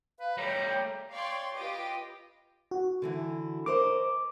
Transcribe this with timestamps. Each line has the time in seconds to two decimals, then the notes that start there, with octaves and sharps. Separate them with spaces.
0.20 B4 F5
0.37 G3 A3 C#5 A#5
0.67 G5
1.12 C#5 D5 F5 G5 C6 C#6
1.54 F4 G4 B4 D#5 D6
2.71 F#4
3.02 D3 E3 E4
3.66 A#4 C5 D#5 D6